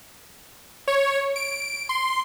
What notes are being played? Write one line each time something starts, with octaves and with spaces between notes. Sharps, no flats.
C#5
D7
C6